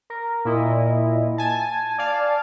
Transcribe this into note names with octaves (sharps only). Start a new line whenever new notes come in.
A#4
A#2 E4 D#5
G#5 A5
D5 F5 A5